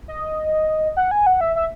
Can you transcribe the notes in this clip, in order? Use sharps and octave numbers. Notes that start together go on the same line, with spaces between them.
D#5
F#5
G#5
F#5
E5
E5